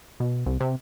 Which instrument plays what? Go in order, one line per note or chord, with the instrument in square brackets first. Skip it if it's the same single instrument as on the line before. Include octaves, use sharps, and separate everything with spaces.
[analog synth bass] B2
C2
C3